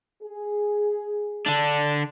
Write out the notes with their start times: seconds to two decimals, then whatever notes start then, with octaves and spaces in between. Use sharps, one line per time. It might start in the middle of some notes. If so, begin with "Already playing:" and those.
0.23 G#4
1.46 D3 D4